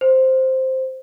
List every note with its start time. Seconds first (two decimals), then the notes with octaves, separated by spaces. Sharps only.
0.01 C5